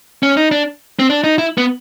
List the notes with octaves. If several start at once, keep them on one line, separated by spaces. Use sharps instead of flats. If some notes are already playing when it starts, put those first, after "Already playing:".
C#4
D#4
D4
C4
D4
D#4
E4
B3